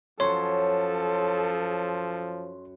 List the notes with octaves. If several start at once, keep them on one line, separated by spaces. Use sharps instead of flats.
F#2 F3 F#3 A4 C#5 C6